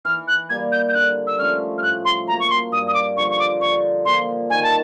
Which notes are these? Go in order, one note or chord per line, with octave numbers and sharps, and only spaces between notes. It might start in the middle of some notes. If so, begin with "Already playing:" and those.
E3 F6
F#6
G3 A#3 G#6
G6
G6
D3 F#6
E6
F3 A3 C#4 F6
F6
A2 F#6
C6
F#3 A#3 A#5
C#6
C6
G2 D#6
D#6
D6
D3 F3 C#6
C#6
D6
D3 C#6
F3 A#3 C6
D#3 G#5
A5